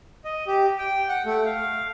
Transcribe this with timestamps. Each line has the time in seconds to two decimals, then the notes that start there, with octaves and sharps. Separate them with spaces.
0.25 D#5
0.47 G4
0.78 G5
1.09 F#5
1.25 A3
1.46 F5